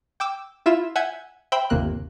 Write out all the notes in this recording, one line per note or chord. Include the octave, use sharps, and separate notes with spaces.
G5 D6 E6
E4 F4 E5 E7
E5 F#5 G#5 G6 G#6
C5 E5 G5 B5 G6
G1 D#2 C3 A#3 F#6